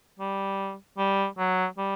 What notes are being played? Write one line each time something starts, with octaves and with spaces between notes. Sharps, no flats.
G3
G3
F#3
G3